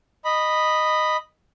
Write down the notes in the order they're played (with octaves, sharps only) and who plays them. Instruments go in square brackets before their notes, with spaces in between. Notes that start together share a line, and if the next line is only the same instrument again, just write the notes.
[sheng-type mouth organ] D#5 B5